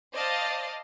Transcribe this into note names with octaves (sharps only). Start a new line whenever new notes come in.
C5 D5 D#5 F5 A5